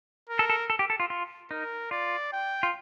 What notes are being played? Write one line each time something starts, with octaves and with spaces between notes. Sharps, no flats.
A#4
A4
A4
A4
G4
A4
F4
F4
D#4 A#4
F4 D5
G5
F4